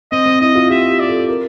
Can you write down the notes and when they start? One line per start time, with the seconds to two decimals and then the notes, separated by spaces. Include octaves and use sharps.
0.12 C4 D#5
0.26 C4
0.41 E4 D#5
0.55 F4
0.69 G4 E5
0.90 G4
0.99 D5
1.09 A4
1.29 A#4